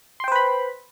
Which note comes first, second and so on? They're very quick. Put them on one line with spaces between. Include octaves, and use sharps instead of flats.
C6 G5 C5 B4 B5